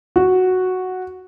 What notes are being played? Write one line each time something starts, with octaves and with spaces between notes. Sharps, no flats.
F#4